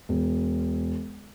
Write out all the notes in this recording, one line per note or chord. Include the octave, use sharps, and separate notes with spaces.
E1